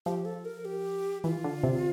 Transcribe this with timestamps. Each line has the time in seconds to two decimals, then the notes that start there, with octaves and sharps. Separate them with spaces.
0.06 F3 G4
0.25 A4
0.45 A#4
0.65 G4
1.24 E3 F4
1.44 D3
1.63 C3